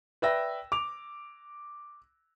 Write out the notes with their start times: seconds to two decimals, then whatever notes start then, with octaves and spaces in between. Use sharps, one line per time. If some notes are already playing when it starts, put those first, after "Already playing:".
0.22 B4 D5 E5 G5 E6 A#6
0.72 D6 F7